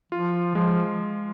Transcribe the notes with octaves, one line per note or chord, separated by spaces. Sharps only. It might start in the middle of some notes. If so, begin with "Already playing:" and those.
F3 F4
F3 G#3